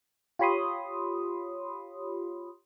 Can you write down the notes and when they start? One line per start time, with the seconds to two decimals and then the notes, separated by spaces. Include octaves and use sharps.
0.39 F4 G4 C#5 B5 C6 D#6